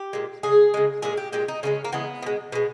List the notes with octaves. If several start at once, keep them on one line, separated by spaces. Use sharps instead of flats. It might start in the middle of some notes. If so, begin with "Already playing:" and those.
Already playing: G4
A#2 G#3
C#3 G#3 G#4
C#3 G#3
A#2 G#3 G#4
G4
A#2 G#3 G4
D#4
C#3 E3 G#3 C#4
A#3
C#3 E3 G#3 B3
B2 G#3
B2 G#3